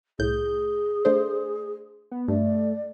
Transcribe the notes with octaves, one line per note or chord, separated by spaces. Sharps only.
C2 A2 G#4 G6
A3 D4 C5
B3
G2 A3 D5